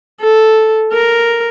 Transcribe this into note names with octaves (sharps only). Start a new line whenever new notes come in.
A4
A#4